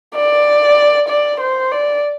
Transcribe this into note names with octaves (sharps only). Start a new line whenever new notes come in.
D5
D5
C5
D5